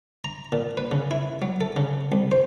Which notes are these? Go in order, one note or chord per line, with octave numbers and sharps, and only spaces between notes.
A#5
A#2
B4
C#3
E4
F#3
A4
C#3
C2
C5